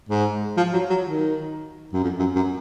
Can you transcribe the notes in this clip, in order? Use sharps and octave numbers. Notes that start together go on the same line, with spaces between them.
G#2
F3
F#3
F#3
D#3
F#2
F2
F#2
F#2